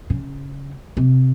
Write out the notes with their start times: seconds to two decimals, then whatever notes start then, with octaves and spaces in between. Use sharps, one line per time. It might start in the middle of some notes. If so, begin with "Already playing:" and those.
0.10 C#3
0.97 C3